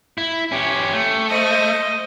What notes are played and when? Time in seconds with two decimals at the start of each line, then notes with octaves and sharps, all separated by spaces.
0.18 E4
0.52 C#4 G4
0.93 A3
1.29 C5 D#5